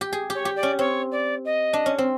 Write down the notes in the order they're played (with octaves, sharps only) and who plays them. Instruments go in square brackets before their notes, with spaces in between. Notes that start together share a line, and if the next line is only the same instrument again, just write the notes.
[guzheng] G4
G#4
G4
[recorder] C#5
[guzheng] G4
[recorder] D5
[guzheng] C#4
[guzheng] C4 [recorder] C#5
[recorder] D5
D#5
[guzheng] D4
C#4
C4